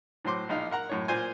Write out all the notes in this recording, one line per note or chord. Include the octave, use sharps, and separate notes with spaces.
A2 F#3 C5 C6 D6
A#1 D#4 F5
A#4 F#5 A#5
F#2 A2 C#5
A#2 F4 C5 G#5